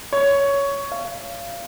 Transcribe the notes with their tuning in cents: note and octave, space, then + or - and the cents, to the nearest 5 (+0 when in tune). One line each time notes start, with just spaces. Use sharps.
C#5 +10
F5 -30